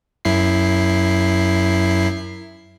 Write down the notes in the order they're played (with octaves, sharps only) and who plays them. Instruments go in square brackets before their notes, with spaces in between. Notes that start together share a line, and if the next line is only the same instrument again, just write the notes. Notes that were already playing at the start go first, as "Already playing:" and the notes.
[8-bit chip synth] F#2 E4 C7